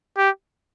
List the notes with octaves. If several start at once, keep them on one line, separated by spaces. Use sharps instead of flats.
G4